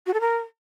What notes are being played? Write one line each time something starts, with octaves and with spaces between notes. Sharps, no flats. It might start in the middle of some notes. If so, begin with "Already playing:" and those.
F#4
A4
A#4